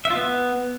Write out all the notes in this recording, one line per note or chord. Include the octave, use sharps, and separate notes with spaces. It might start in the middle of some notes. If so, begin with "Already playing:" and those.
E5
F4
B3